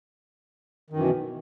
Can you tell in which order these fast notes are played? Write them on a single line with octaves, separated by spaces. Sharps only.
D#3 F#2 E3 B2